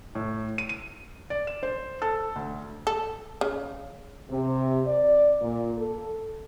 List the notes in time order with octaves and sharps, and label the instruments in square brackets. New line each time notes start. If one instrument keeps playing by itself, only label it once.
[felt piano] A2
D#7
D#7
D5
E7
C5
A4
D2
[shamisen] A4
C#3
[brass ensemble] C3
D5
A#2
A4